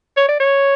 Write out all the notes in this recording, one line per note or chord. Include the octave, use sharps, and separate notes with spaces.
C#5
D5
C#5